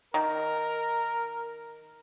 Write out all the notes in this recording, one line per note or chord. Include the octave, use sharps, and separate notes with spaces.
D#3 A#4